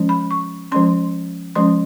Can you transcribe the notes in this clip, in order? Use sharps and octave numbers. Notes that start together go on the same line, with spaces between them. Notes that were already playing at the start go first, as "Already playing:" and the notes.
Already playing: F3 G#3 C#4
B5
C#6
F3 G#3 C#4 C6
F3 G#3 C#4 C6